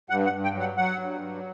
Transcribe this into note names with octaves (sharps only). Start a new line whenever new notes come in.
G2 F#5
F#5
G2
G5
F#3 F#5
F#3 F#5
G2
F#3